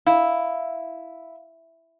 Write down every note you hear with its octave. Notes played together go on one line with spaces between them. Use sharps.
E4 F5